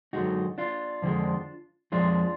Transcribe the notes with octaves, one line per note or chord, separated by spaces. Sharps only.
F#2 D3 G#3 D#4 F#4
D4 F4
F2 D3 F3 G#3
F2 F3 G#3 D4 F4